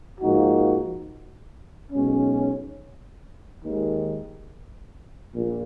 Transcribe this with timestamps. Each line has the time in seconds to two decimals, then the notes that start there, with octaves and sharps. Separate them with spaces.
0.20 G#2 F3 A#3 D#4 F#4
1.91 B1 B2 G#3 C#4
3.63 D#2 D#3 G#3
5.34 A#1 A#2